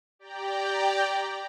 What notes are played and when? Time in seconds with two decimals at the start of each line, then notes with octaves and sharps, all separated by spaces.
0.19 G4 D5 G5 A#5